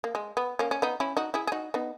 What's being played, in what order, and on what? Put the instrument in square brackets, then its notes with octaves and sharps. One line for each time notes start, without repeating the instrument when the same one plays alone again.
[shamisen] A#3
G#3
B3
A#3 C#4
C#4
B3 D#4
C#4 E4
D#4 F#4
E4 G#4
G#4
D#4 F#4
B3 D#4